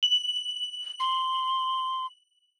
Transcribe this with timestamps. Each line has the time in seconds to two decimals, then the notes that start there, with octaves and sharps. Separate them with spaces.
0.03 F#7
1.00 C6